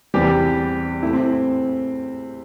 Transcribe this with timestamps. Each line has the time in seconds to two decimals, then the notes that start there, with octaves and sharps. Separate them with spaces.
0.14 E2 C3 E3 G3 G4
1.03 C3 A3 E4
1.13 C4